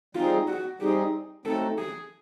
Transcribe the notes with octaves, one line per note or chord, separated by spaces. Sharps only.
G3 C4 D#4 F4 G#4
F#4
G3 C4 D#4 G4 G#4
F#3 A3 C4 D#4 A4
G#4